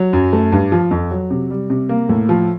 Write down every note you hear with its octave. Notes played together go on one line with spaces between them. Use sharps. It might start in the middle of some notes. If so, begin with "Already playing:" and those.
Already playing: F#3
F#2
A3
G2
F3
F2
F#3
C3
G3
C3
A#3
A2
F3